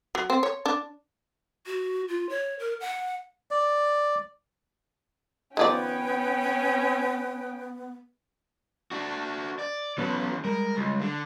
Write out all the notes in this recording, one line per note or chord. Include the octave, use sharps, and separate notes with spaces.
F#3
C4
C#5
D4
F#4
F4
C#5
A#4
F#5
D5
D#3 F3 B3 C#4 D5 G5
D4 F#4
D5
E3 F#3 B3 C#4 B4
G3 G#3 A#4
C#2
D3